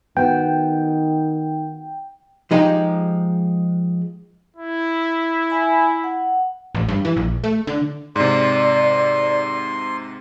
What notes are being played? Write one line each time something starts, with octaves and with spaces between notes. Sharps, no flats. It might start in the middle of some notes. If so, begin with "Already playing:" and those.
D#3 B3 F#4 G5
F3 G#3 D#4 G4
E4
E5 G#5 B5
F#5
A1
G2
E3
A#1
A3
D3
G#2 C3 D5 C6